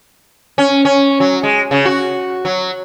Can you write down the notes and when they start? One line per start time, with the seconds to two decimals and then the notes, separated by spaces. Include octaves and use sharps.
0.58 C#4
0.85 C#4
1.20 F#3
1.43 G#3
1.71 C#3
1.85 F#4
2.45 F#3